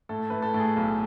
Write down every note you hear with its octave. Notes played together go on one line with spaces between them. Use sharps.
A2 A4
A2 B4
A4
A2
G#4
B1